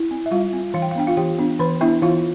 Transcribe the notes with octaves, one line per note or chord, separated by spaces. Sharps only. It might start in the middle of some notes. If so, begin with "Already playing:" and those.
Already playing: E4
C4
E5
G3 F4 F5
C4
E3 F5
G5
F5
B3 D4 G5
F4 F5
E3 G4 G5
B3 D4
E3 B4 B5
B3 D4 E4 E5
E3 F4 F5